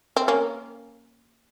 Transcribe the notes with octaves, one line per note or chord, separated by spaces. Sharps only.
C4
A#3 C#4